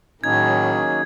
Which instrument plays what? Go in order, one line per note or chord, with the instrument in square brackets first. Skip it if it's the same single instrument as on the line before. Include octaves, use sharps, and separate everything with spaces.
[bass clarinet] A2 [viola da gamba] D#3 F#3 G#4 [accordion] A#3 C#4 D#4 [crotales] G#6